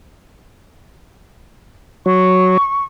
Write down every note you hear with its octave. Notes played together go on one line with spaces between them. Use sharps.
F#3 C#6